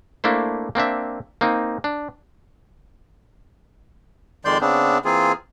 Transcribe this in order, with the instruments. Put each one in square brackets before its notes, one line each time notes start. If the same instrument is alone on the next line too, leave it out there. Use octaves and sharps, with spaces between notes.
[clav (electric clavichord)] A3 A#3 D4 E4 C5
A#3 C4 D4 E5
A#3 C4 D#4
D4
[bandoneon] F2 D#3 G#3 D5 C6 G6
C#3 B3 C4 D4
E3 A#3 C4 F4 G#4